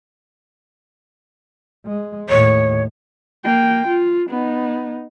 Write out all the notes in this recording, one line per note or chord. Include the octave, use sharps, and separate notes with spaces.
G#3
D#2 A2 C#5
A#3 G5
F4
B3 D#4